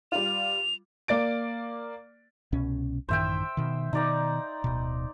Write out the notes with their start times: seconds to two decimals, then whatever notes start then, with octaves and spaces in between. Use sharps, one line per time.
0.12 G3 F4 F7
1.08 A#3 D5 A6 D7
2.52 C2 B2 C#4
3.09 A1 F#2 D#3 C5 E5 G5
3.57 B2 D#3
3.93 B2 D#3 D#4 D5 A#5
4.64 D1 B2